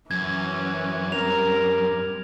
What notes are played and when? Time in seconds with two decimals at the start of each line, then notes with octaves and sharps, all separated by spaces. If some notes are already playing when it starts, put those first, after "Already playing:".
0.11 F#2 E3 C#4 G#6
1.12 G3 C4 A#4 F7